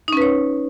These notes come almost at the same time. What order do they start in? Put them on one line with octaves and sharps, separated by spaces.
D#4 C#4 B4 C#5